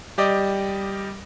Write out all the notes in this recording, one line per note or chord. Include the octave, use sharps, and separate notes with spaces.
G3 G4 D5 D#5